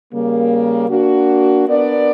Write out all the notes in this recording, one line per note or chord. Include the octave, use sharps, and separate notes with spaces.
C#3 G3 A#3
A#3 D4 F#4
B3 D4 A#4 D5